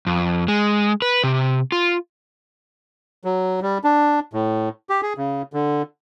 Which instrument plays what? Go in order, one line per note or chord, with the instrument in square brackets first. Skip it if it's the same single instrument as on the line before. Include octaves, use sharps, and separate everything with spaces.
[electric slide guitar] F2
G#3
B4
C3
F4
[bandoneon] F#3
G3
D4
A2
G4
G#4
C#3
D3